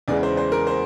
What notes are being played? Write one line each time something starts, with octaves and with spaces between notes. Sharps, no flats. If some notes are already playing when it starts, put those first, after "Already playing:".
E2 C#3 E3 G#3 D5
C5
C5
A#4
C5